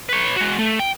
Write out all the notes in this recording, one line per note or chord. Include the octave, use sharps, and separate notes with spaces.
B4 C#5
G#3 F#4
A3
G5